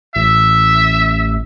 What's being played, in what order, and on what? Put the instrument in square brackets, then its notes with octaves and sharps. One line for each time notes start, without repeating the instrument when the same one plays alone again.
[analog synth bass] A1 [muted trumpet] E5